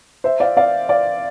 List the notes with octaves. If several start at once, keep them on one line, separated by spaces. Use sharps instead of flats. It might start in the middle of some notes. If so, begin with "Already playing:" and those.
C5 E5
D5 F5
D5 F5
D5 F5